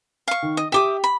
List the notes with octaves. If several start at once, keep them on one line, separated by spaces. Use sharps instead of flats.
F5 C#6
D#3
D#5
G4 E5 G5 D6 D#6
B5